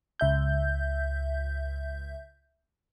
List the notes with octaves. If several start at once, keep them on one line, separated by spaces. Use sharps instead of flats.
C#2 E5 G6